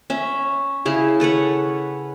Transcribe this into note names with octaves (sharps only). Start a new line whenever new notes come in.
C#4 E5
C#3 E4 G#4
A4 B4 C#5 F#5